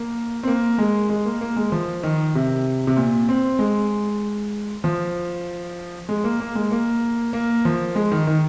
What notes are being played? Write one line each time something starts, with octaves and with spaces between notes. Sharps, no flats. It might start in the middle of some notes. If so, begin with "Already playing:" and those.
Already playing: A#3
C4
A#3
G#3
G#3
A#3
A#3
G#3
F3
D#3
C3
C3
A#2
C4
G#3
F3
G#3
A#3
A#3
G#3
A#3
A#3
F3
G#3
D#3
D#3